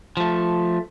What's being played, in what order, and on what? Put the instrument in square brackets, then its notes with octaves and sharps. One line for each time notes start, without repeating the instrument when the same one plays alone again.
[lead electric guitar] F3 A3